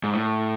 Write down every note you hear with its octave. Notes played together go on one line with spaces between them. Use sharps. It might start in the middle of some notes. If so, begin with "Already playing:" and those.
G#2
A2